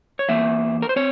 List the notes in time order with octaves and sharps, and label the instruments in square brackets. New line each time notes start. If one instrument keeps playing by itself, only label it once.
[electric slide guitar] C#5
E2 E3 A#3 E5
A#4
C5
C4 C#5